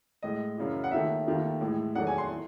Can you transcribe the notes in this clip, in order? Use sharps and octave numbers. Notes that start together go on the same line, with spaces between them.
A2 G#3 D#5
F#2 C#3 E3
F#5
D#2 D#3 A3 E5
D#2 D#3 A3
A2 E3 G#3
E2 D#3 F#3 A3 F#5
G#5
C6
E3